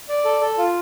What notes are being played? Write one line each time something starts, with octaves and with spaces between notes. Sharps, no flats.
D5
A4
A4
F4